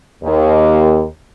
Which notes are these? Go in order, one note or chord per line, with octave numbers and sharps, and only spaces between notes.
D#2